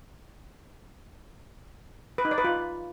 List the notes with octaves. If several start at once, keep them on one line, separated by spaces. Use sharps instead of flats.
B4
D#4
D5
B4
F4